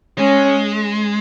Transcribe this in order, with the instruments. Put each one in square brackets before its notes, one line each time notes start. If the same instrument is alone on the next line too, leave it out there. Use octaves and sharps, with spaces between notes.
[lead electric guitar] G#3 [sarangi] C#4